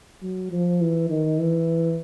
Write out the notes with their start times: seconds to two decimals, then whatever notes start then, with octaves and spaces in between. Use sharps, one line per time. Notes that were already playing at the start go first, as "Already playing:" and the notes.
0.23 F#3
0.51 F3
0.81 E3
1.10 D#3
1.39 E3